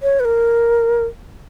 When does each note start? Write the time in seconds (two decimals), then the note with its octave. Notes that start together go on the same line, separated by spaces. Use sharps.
0.03 C#5
0.20 B4
0.25 A#4